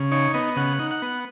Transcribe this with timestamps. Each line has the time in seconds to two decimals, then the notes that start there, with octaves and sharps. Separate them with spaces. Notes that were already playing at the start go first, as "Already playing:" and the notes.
Already playing: C#3
0.11 D#4 C#5
0.34 B3 D#5
0.56 C#3 F#5
0.79 D#4
0.91 F#5
1.02 B3